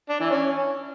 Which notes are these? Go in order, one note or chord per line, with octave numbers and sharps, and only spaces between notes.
D4
E3
C#4